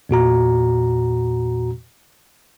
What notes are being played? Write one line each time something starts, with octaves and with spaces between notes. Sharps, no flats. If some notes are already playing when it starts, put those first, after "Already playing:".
E2 A#2 F#4 A#5